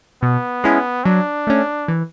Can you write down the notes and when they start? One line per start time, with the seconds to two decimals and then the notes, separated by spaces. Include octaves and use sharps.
0.22 B2 B3
0.64 G#3 C#4 E4
1.05 F#3 D4
1.47 A3 C#4
1.88 E3